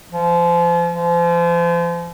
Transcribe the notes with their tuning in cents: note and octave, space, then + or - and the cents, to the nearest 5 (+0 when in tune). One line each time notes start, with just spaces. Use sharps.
F3 -30
F3 -35